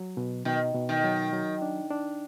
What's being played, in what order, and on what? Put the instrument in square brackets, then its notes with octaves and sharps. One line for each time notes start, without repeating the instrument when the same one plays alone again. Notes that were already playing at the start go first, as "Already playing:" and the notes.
Already playing: [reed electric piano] F#3
B2
[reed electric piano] B2 [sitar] D#3
[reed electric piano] B2
[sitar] D#3
[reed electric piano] F#3
F#3
D4
D4